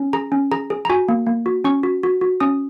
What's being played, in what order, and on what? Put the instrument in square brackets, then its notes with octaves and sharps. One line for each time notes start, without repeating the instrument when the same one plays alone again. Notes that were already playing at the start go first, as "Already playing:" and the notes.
Already playing: [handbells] C#4
G#4 A#5
C#4
G#4 A#5
G#4
A#5
F#4 G#5
A#3
A#3
F#4
C#4 C#6
F#4
F#4
F#4
C#4 D#6